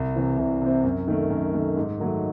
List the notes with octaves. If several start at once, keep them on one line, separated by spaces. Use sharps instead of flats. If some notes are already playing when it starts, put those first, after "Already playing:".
Already playing: C2
C3 E3 C4
C2
C3 E3 C4
F#2
D#3 A3
F#2
D#3 A3
G#2
D#3 F#3 A3